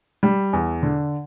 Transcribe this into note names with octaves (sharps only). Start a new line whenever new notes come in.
G3
E2
D3